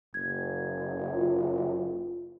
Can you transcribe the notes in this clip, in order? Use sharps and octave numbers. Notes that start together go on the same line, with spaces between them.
F#1 G#6
F4